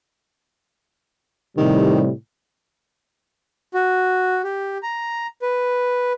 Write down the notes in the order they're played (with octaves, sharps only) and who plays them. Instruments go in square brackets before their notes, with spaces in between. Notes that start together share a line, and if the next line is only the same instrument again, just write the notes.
[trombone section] A2 C3 G3 [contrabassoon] D#3
[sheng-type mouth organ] F#4
G4
A#5
B4